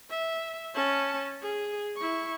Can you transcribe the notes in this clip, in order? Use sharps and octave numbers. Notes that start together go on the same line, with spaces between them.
E5
C#4 A5
G#4
E4 C#6